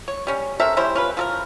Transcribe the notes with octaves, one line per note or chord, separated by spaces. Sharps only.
C#5
G3 C#4
C4 A4 A#4 E5
G3 C#4 E4 C5
C#4 F4 B4
F3 A4 A#4